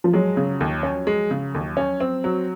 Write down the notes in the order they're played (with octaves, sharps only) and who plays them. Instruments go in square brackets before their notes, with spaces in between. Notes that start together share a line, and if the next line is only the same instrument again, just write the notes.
[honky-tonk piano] F3
[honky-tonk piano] F#3 [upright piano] G#3
[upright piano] C#3
D#2
C#4
G#3
C#3
D#2
C#4
C4
F#3